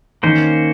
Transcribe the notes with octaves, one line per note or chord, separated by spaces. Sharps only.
D#3 A#3 C#4 C5